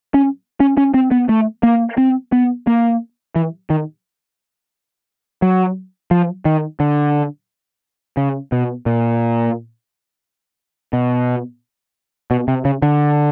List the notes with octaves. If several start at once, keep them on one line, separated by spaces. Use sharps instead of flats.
C#4
C#4
C#4
C4
B3
A3
A#3
C4
B3
A#3
E3
D#3
F#3
F3
D#3
D3
C#3
B2
A#2
B2
B2
C3
C#3
D3